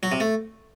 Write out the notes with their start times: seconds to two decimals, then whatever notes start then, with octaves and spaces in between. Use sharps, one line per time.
0.03 F#3
0.12 C3
0.20 A3